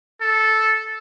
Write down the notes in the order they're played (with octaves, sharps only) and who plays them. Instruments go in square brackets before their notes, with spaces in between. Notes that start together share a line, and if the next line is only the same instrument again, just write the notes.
[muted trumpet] A4